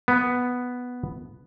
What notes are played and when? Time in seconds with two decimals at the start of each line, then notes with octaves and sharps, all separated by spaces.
0.08 B3